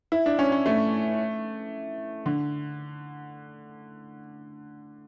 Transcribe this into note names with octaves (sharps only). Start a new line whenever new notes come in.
E4
D4
C#4
C#4
A3
D3